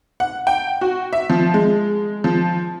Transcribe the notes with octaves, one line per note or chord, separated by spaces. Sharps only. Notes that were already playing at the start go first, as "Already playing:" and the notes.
F#5
G5
F#4
E5
F3
G#3
F3